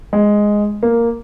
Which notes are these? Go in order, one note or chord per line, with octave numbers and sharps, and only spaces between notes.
G#3
A#3